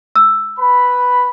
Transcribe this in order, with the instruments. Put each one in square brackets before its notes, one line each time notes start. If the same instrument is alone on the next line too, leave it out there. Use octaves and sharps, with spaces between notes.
[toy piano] E6
[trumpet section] B4 B5